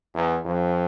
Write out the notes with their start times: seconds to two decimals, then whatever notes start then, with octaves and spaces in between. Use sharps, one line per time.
0.15 E2
0.45 F2